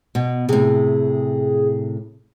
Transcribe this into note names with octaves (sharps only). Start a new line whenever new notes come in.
B2
A2 C3 G#4